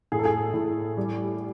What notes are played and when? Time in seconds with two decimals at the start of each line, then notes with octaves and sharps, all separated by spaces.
0.12 A2 G#4
0.19 A4
0.25 G#4
0.54 A2
0.97 G3